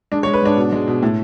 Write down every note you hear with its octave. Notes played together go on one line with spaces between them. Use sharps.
G#3 D4
C#5
G#3
B4
G#2 D4
B2
G#3
B2
A2